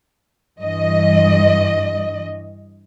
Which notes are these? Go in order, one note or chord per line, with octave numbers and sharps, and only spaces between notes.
G2 E3 D#5